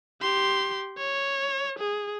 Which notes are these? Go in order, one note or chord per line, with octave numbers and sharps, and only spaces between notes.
G4 C6
C#5
G#4